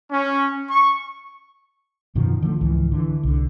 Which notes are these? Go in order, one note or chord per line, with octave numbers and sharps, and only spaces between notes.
C#4
C#6
F#2 B2 D#3 F3
D3 F3 G#3 A3
C#2 G#2 E3 F3
D3 E3
C2 D3